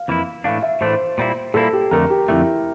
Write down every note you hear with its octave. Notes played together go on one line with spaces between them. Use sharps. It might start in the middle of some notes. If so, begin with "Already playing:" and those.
Already playing: F5
F2 E3 A#3 E4
A2 E3 A3 D4 F5
E5
A2 E3 A3 D4 C5
A#2 G3 A#3 E4
A#2 G3 A#3 E4 A4
G4
F2 D3 A3 A#4
G4
F2 D3 A3 E4